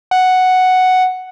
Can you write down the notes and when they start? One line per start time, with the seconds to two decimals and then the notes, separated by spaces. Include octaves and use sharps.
0.11 F#5